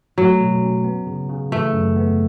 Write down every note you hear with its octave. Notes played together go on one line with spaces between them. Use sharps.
F#3 A3
B2
C#4
B3
C#3
C#3
E3 A3
F#2
B3